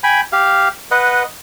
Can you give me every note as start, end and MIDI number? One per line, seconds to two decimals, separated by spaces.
0.03 0.21 79
0.03 0.21 80
0.03 0.21 83
0.33 0.69 67
0.33 0.69 77
0.91 1.23 71
0.91 1.23 75
0.91 1.23 78